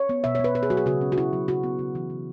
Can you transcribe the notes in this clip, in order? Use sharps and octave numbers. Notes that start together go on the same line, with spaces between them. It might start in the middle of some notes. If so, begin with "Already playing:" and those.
Already playing: C#5
B3
B2 E5
B3 C#5
B4
B2 B4
G#4
F#3 F#4
G#4
C#3 F#4
C#4
F#4
C#3 E4
F#3
C#3 F#4
B3
C#3
E3
C#3